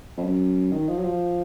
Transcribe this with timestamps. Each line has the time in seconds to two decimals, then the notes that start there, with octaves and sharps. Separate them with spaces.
0.17 F2
0.24 F#2
0.72 D#3
0.88 F3
0.98 F#3
1.04 F3